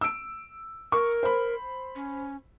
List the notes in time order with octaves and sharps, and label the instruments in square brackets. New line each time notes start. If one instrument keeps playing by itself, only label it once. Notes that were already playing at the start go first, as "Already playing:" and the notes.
[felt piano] E6 D7
[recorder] A#4 [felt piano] C#6
[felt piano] C5 B5
[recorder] C#4